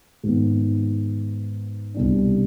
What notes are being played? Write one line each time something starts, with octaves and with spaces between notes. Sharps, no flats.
G#2 D#3 B3
C2 B2 G3 D4